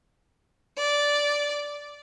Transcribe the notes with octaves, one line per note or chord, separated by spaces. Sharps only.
D5